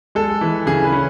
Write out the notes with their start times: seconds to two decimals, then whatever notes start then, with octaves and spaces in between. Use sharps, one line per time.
0.15 G#3 A4
0.41 E3
0.66 C#3 G#4
0.84 B4
0.92 C#4